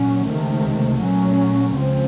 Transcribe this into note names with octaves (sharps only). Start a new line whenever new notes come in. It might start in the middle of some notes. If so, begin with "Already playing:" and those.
Already playing: A#2 F#3 C#4
C#2 C3 D#3 A3
A#2 F#3 A3 C#4
C#2 C#3 F3 C4